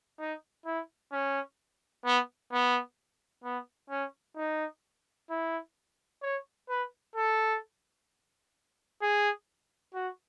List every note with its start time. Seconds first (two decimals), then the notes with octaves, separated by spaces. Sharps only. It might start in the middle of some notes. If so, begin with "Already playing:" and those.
0.19 D#4
0.66 E4
1.12 C#4
2.05 B3
2.52 B3
3.44 B3
3.90 C#4
4.37 D#4
5.30 E4
6.22 C#5
6.69 B4
7.16 A4
9.02 G#4
9.94 F#4